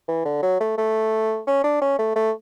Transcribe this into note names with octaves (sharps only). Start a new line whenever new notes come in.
E3
D3
F#3
A3
A3
C#4
D4
C#4
A3
A3